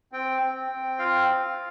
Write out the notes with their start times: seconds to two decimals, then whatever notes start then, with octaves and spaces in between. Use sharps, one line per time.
0.12 C4 G5
0.42 C4
0.70 C4
0.99 F4 F5
1.28 F4